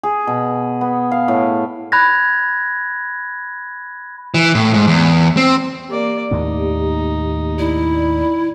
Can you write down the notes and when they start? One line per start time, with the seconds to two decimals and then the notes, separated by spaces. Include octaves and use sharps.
0.03 G#4
0.27 B2
0.81 B3
1.12 F5
1.28 A2
1.92 B5 F#6 G#6 A#6
4.34 E3
4.55 A2
4.74 G#2
4.87 E2
5.37 C4
5.89 A#3 G4 D5
6.31 D#2 A2 A#3 D#4
7.58 E4 D5